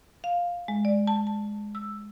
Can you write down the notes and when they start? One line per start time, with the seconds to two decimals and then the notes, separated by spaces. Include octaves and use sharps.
0.24 F5
0.68 G#3
0.85 D5
1.07 A5
1.27 A5
1.75 E6